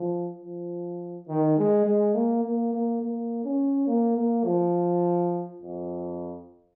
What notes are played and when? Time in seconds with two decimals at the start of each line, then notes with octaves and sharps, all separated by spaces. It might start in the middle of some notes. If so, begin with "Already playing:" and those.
Already playing: F3
0.41 F3
1.28 D#3
1.58 G#3
1.86 G#3
2.15 A#3
2.43 A#3
2.73 A#3
3.02 A#3
3.44 C#4
3.87 A#3
4.17 A#3
4.45 F3
5.62 F2